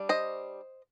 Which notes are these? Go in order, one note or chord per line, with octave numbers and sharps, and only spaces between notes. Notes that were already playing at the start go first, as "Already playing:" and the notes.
Already playing: G3 D4
C5 D#5